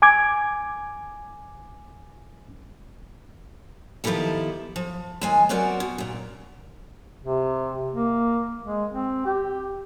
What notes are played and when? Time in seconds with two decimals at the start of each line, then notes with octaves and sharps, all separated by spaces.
0.02 G#5 D6 G#6
4.04 D#3 F3 B3 E4 G4 A4
4.76 F3
5.21 D#2 G#3 G#5
5.49 F#3 B3 C4 F#4 A#4 D5
5.80 B2
5.98 D#2 A#2
7.25 C3
7.93 A#3
8.64 G#3
8.91 C4
9.25 G4